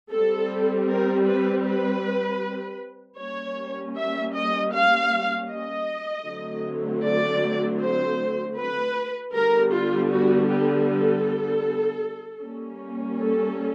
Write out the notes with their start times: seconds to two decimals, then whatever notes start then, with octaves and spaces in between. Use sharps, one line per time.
0.11 G3 C4 A4
0.88 A#4
1.27 B4
1.65 B4
3.19 G3 A#3 C#4 C#5
3.96 E5
4.34 D#5
4.73 F5
5.50 D#5
6.26 D3 F#3 A3 C4
7.03 D5
7.81 C5
8.57 B4
9.34 D3 G3 B3 A#4
9.73 F4
10.11 F#4
10.49 G4
10.88 A4
12.41 G3 A#3 C#4
13.18 A4